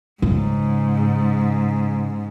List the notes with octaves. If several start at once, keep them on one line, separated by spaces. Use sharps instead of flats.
G#2 C#3